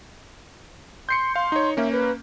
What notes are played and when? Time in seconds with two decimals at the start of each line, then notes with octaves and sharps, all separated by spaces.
1.09 C6 G6 C7 C#7
1.36 F5 C6
1.52 D#4 C#5
1.77 A#3 C#4 E5
1.92 B4